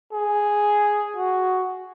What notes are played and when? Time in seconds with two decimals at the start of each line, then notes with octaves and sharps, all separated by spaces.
0.13 G#4
1.16 F#4